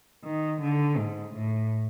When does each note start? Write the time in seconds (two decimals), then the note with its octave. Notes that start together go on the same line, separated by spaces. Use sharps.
0.24 D#3
0.62 D3
0.97 G#2
1.34 A2